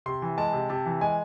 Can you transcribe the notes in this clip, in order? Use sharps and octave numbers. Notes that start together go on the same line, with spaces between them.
C3 C6
E3
G#3 A5
C3
C3 A5
E3
G#3 G#5